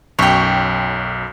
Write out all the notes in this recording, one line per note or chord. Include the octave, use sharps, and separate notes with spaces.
B1 F#2 C#5 G5